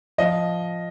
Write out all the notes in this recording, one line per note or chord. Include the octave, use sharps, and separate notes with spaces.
F3 D#5